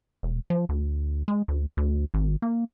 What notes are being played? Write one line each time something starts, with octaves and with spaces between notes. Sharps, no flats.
E1
F3
D2
G#3
D2
D2
G#1
A#3